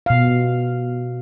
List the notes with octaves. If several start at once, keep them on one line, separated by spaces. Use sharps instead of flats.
B2 F5